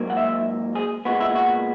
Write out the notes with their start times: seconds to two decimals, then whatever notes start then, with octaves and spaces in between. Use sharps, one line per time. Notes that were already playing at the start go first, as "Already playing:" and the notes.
Already playing: G#2 F#3 A#3
0.10 F#5
0.17 E5
0.75 G#4
1.05 A#2 G#3 B3 F#4
1.20 E4
1.35 F#4